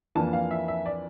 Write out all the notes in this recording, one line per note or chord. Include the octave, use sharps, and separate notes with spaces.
F2 E3 A#3 D4 A5
F5
E5
E5
D5